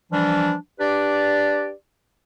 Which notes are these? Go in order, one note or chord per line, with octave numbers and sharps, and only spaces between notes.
E3 F3 G3 D4
D4 G4 B4 D5